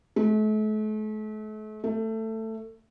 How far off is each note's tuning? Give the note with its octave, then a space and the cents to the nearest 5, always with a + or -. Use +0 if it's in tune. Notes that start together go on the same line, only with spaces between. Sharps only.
A3 -40
A3 +15